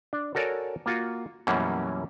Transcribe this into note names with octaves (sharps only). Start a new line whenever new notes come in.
D4
F#4 A4 A#4 C#5 D5 G#5
A#3 F4 F#4
F#2 B2 E3 G3 A#3 C#4